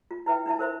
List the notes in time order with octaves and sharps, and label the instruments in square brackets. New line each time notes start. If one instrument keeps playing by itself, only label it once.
[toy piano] F4
E4 B4 E5 G5
D4 E4 E5 A5
A#4 C5 E5 B5